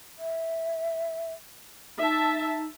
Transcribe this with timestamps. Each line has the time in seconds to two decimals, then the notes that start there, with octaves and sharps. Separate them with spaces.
0.19 E5
1.98 D#4 E5 A5